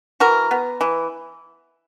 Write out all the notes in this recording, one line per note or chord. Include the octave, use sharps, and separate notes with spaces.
E3 F#4 A#4
B3
E3